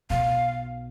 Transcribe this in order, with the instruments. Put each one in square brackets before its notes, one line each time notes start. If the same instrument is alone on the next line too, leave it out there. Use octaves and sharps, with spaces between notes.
[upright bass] B1 B2 [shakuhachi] F5